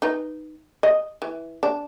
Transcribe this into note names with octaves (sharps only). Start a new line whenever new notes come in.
D#4 B4
D#5
E3
D4